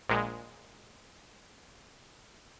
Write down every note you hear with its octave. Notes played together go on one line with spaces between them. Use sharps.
A#1 A#2 G#3